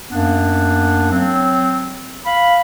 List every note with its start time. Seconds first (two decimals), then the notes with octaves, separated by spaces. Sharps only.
0.11 F#2 A#3 B3 D4
1.11 F#3 C4
2.25 F5 B5